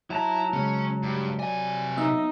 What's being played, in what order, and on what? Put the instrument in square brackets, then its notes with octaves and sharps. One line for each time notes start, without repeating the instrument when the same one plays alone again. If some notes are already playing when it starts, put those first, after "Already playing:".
[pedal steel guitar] F#3 A5 A#5 [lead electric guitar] E4
[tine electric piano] C#3 G#3 [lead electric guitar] C#4
[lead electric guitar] G2
[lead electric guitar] C3 G#5 [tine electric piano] D5
[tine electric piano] B3 E5 E6 [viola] D#4